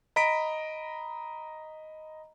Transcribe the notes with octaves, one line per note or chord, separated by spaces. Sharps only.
D#5 A#5 B5 B6 D7